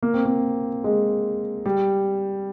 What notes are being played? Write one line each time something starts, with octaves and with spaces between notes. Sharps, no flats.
A#3
C4
A#3
G#3
G3